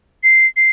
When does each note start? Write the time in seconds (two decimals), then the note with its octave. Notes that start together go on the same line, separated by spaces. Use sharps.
0.24 C7
0.57 C7